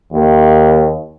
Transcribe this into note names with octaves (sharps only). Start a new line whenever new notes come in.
D#2